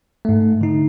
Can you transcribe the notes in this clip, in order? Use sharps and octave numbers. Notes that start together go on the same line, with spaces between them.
G#2 A3
D3 D#4